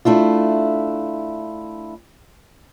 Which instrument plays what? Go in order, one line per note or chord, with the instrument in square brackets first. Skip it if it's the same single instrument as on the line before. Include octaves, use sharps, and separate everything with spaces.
[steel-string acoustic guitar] A3 D4 E4 F4